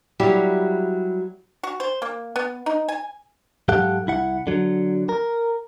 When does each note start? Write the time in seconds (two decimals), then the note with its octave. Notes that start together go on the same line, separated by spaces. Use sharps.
0.20 F#3 G3 E4 G4
1.63 F#4
1.80 C5
2.02 A#3
2.36 B3
2.66 D#4
2.88 G#5
3.68 G#2 F#3 G4 A4 F5 F#5
4.07 C2 E4 F#5
4.47 D3 F#3
5.09 A#4